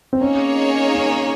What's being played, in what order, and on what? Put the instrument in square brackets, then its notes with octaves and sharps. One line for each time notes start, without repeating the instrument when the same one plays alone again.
[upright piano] C4
[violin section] A#3 D#4 G#4 C#5 [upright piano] C#4
[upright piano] C#4